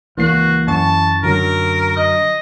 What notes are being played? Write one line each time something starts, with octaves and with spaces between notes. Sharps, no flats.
C#2 E3 A#3 F#4 C7
F#2 A5 C#6
D3 F#3 A#4
D#5